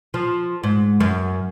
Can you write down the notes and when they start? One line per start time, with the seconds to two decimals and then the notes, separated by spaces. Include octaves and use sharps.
0.14 F3
0.64 G#2
1.00 F#2